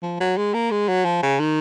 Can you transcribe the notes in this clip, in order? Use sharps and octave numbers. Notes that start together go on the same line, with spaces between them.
F3
F#3
G#3
A#3
G#3
F#3
F3
C#3
D#3